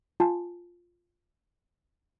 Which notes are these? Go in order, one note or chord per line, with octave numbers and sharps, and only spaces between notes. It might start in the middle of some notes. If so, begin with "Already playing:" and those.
F4 G#5 A5